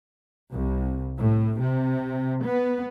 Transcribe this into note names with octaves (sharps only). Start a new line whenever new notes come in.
C2
A2
C3
B3